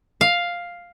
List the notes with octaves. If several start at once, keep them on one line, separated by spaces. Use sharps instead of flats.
F5